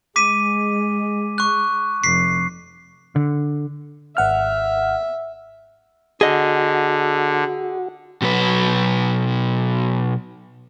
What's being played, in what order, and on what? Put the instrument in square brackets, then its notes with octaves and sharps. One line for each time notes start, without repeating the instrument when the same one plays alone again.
[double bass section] G#3 [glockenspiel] D6 B6 D#7
[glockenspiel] C#6 F#6
[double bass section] F1 [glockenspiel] B6 C7
[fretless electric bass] D3
[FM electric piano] G#1 F#5 F6 [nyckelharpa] E5
[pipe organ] D3 [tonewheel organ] F#4 [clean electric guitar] G#4 D#5
[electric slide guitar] B2 F#3 B4